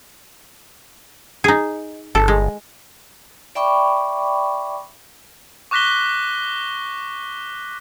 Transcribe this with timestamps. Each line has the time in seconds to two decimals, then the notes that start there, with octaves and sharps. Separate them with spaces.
1.44 D#4 G#4
2.15 G1 A4
2.28 G#3
3.55 D5 E5 G5 B5 C#6 D6
5.71 C#6 D6 F#6 A#6 B6 G7